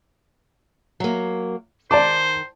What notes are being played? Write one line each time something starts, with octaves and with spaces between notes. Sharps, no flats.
F#3 A#3
D#3 C5 D5 A5 D6